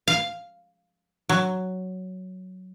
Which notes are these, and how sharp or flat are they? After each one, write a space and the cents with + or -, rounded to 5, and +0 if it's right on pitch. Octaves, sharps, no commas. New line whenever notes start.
F5 +0
F#3 +5